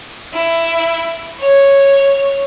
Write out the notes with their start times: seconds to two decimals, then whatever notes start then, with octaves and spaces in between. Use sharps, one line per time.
0.34 E4
1.40 C#5